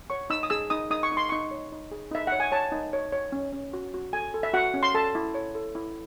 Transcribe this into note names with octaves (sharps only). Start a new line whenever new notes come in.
C#5 C#6
D#4 E6
D#6
G#4 E6
D#4 D#6
D#4 D#6
C#6
D#4
C6
D#4 C#6
C#5
D#4
G#4
D#4 E5
C#5 F#5
G#5
C#5 A5
D#4
C#5
C#5
C#4
C#4
F#4
F#4
A4 G#5
A4
E5
F#4 F#5
C#4
C6
A4 A5
E4
C#5
A4
E4